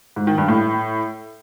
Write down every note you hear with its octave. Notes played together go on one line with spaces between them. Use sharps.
G#2
D#3
G2
A2